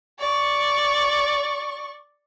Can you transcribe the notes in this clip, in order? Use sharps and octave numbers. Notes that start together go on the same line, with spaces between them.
D5 C#6